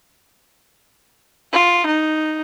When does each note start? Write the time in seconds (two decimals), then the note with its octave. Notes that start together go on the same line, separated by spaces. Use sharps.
1.53 F4
1.86 D#4